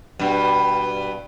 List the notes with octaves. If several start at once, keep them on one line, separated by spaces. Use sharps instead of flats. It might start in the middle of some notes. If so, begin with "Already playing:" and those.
G2 B2